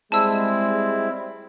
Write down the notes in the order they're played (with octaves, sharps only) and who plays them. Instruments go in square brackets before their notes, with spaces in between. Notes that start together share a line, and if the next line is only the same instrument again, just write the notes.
[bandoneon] G3 C4 E4 [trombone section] G#3 [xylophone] A5 E6